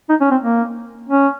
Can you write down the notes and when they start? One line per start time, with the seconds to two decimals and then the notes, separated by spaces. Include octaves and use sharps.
0.10 D#4
0.21 C#4
0.31 C4
0.42 A#3
1.09 C#4